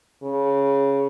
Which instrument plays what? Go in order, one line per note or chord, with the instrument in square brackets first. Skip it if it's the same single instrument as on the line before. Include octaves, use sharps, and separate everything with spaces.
[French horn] C#3